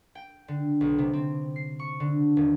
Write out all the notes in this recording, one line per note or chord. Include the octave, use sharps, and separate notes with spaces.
G5
D3
B1
C3
C4
C7
C#6
D3
D#1